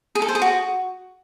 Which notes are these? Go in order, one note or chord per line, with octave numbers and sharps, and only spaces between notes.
G#4
A4
C5
G#4
F#4